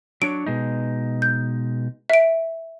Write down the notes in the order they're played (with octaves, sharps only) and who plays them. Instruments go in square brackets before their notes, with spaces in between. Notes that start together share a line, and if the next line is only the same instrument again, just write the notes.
[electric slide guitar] F#3 D4 C#5 [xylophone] D7
[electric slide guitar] B2 G#3 D#4
[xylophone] G6
E5 D7